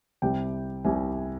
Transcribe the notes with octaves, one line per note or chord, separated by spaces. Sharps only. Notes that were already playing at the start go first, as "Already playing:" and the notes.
C2 C3 G3 G5
C2 C3 G3 G#5